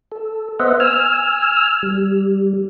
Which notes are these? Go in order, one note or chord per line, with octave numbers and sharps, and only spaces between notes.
A4
B3 C5 D#5 E5 F#5
G#5 E6 F6
G3